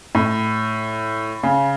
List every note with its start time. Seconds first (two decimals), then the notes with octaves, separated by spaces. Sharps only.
0.15 A2
1.43 C#3